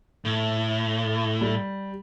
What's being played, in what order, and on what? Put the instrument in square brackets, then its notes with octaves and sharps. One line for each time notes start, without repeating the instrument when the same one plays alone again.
[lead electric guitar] A2
[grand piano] G3